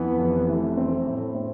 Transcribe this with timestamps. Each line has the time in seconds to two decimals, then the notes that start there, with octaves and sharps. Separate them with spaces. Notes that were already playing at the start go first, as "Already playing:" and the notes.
Already playing: F2 E3 B3
0.19 F1
0.48 E3 A3
0.77 C4
0.92 A3
1.06 A2
1.35 C4